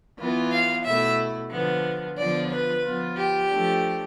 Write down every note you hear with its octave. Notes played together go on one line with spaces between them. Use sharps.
E3 B3 F4
F5
B2 A3 E4 E5
D3 F3 B3
D3 F3 B3 F4 D5
B4
F3 B3 F4
G4
F3 A3 D4